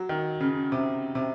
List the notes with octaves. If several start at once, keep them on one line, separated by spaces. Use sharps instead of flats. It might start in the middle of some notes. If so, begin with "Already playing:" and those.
Already playing: F#3
D#3
C#3
C3
C3